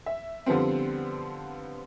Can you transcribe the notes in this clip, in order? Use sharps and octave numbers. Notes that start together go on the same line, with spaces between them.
E5
D3 F3 G3 B3 C4